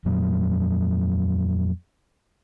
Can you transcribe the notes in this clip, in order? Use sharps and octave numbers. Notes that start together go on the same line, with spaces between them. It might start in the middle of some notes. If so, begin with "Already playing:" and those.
F2 A#2 F#3